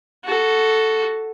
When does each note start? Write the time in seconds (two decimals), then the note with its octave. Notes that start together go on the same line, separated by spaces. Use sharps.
0.25 F#4 A4